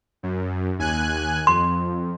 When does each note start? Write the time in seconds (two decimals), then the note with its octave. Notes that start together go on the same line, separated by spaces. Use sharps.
0.23 F#2
0.79 D#2 G#5 F#6
1.47 F2 C6